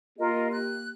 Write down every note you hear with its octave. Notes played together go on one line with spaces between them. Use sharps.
A#3 F4 G4 A#4 D#5
F#6